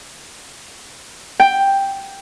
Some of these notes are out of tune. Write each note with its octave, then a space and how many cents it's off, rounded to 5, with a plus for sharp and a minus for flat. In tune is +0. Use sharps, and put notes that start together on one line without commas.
G5 +5